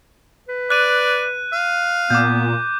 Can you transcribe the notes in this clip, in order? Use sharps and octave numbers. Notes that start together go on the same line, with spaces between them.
B4
D5 F#6 D#7
F5
A#2 B3 D6 G6